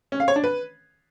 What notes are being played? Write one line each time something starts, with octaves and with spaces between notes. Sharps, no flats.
C#4
F5
C#5
D4
B4